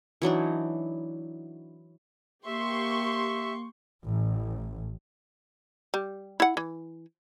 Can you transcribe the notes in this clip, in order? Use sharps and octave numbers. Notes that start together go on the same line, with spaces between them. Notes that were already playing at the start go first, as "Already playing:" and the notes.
E3 F#3 D4 D#4
A#3 G4 E5 C6 C#6
A1
G3
E4 F#5
E3